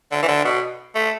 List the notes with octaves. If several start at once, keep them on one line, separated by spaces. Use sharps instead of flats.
D3
E3
D3
B2
A3